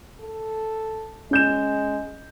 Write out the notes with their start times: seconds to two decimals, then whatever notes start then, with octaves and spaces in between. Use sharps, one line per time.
0.20 A4
1.31 G#3 C#4 G6 E7